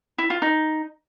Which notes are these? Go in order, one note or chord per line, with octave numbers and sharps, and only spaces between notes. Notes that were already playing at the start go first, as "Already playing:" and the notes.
E4
F4
D#4